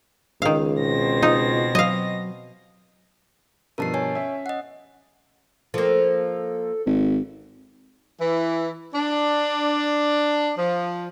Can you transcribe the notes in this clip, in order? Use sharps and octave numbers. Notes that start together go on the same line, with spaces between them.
C#2 D#3 F5
B2 C4 A#6
D#4 F4
F#3 D#5 F5
G2 B2 F3 A#4 A5 C7
C#5 G#5
C#4 E5
D#5 F#5
F3 A#3 A4
G#1
E3
D4
F3